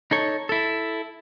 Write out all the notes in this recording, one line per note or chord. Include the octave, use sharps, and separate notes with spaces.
D#4 A4 C#5
E4 A4